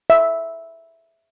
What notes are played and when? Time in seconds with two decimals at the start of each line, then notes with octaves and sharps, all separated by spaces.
0.10 E5